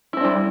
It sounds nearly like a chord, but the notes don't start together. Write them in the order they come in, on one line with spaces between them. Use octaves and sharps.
E4 C4 D4 G3